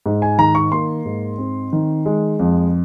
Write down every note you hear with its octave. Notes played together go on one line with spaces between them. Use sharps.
G#2
G#5
D#3 A#5
C#6
A#3 C6
G#2
C4
D#3
G#3
F2